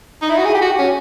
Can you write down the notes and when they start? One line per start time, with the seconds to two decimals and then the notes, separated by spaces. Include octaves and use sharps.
0.22 D#4
0.29 E4
0.38 F#4
0.45 G#4
0.54 G4
0.61 F#4
0.79 C#4